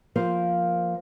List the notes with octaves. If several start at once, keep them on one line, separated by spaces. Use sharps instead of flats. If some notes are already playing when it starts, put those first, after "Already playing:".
F3 A#3 A#4 C5